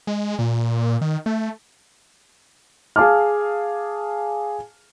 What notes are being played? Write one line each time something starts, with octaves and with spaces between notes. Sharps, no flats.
G#3
A#2
D#3
A3
G#4 F5 A5 D6 F6